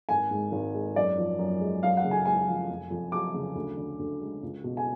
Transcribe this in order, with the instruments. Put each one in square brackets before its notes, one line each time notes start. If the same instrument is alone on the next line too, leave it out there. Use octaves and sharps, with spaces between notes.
[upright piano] G#1 G#5
G#2
G#1
G#3
F#2 D5
F3
F#2
G#3
F#2 F5
F#5
C#3
G#5
G#3 G#5
F3
F1
F2
F#3 D6
C#3
D2
D3
D2
G#3
C#2
B2
G#5